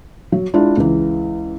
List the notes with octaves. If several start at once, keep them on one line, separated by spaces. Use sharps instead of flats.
F#3
G#3 D4 E4 F4
C#2 E3